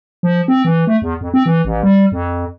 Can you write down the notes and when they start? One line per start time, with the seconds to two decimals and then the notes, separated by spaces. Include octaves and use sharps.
0.23 F3
0.48 C4
0.65 E3
0.87 A3
1.02 E2
1.21 F2
1.34 C4
1.46 E3
1.65 A1
1.83 G3
2.12 F2